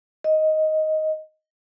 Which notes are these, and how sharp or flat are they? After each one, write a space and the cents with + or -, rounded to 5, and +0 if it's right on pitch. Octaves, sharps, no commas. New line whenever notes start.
D#5 +10